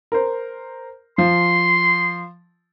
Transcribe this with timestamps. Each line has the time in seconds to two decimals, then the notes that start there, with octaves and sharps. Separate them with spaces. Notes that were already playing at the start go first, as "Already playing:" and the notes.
0.12 A#4 C5
1.18 F3 C6